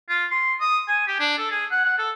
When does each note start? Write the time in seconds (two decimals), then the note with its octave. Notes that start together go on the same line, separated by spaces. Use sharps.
0.09 F4
0.31 C6
0.60 D#6
0.88 G#5
1.07 G4
1.20 D4
1.38 A4
1.51 G#4
1.71 F#5
1.85 F#5
1.98 A4